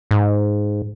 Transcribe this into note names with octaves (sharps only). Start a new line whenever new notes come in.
G#2